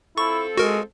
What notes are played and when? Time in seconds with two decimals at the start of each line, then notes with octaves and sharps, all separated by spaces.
0.18 C4 E4 F4 A4 C#6
0.57 G#3 F#4 A#4